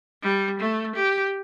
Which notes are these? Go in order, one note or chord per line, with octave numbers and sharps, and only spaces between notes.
G3
A3
G4